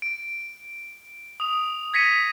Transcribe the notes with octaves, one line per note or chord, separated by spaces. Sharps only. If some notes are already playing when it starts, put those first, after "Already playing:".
D7
D#6 F7
G#6 A#6 B6 C#7 D#7